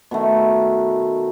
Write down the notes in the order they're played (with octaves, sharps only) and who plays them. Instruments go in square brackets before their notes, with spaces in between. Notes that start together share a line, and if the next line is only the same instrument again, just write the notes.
[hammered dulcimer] B2 D#3 A3